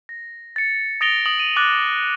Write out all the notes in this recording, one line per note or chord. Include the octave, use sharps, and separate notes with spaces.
A#6
A6 C#7
D#6 A6 A#6 D7 F7 G7
D#6 F#7
D#7
D6 F#6 A6